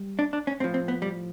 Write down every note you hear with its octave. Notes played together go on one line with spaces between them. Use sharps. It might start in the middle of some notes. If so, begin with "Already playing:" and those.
Already playing: G3
D4
D4
C#4
A2 F3 C4
C4
B3
G3